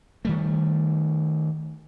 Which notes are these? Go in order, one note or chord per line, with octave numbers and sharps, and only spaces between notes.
D#3 G3 A3